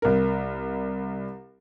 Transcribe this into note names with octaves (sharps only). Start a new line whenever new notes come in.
C2 A#4